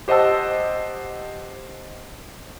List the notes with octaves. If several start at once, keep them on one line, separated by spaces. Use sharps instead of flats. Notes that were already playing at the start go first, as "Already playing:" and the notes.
G4 C5 D#5 F#5 A5 E6